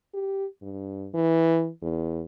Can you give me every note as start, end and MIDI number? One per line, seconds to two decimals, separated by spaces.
0.14 0.46 67
0.62 1.09 43
1.14 1.69 52
1.82 2.23 40